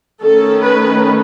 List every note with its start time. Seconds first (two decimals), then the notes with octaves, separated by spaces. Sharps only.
0.21 D#3 A3 C#4 A4
0.64 B4